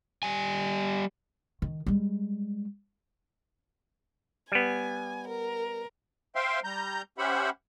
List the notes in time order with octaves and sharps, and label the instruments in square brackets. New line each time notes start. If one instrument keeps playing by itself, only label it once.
[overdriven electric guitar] G3 G#5
[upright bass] D#3
G3 G#3
[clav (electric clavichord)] G3 B3 [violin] G#5
[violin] A#4
[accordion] C5 E5 F5 G5 C6
G3 A#5 G6
C#4 G4 C5 E5 F#5 B5